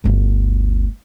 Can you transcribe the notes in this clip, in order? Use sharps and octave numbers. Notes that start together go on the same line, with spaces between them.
G1 D2